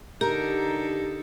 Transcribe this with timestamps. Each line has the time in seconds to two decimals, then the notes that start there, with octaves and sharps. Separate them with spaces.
0.21 D3 D#4 G4 A4 A#4